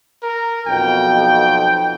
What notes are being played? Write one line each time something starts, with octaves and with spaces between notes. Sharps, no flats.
A#4
B1 F2 B2 G5